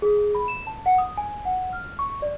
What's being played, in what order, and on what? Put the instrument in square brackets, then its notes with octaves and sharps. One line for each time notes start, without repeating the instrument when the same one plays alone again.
[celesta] G#4
B5
E7
A5
F#5
D#6
G#5
F#5
F6
C#6
D5